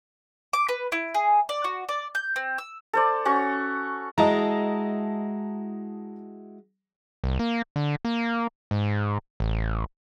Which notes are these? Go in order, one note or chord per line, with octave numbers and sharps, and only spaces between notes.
D6
B4
E4
G#4
D5
F#4
D5
G6
C4
E6
A4 C5 D5
C#4 F#4 C#5 C#6
G#3 E4 F#4 D#5 A5 A#5
C2
A#3
D3
A#3
G#2
A1